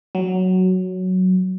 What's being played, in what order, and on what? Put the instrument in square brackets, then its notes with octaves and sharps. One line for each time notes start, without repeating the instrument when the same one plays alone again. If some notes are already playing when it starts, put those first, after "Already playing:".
[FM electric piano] F#3